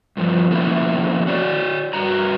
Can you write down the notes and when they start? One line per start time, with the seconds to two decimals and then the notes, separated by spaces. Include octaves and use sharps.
0.17 G2 F3
0.51 F2 B2 D#3 A#3 C#4 E4
1.27 F#4 C#5 D5
1.93 G2 F#4 A#5